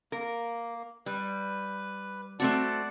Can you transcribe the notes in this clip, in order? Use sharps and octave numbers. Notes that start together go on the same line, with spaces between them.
A#3 A#4
G3 B4
A3 C4 F#4 D5 F#5 A5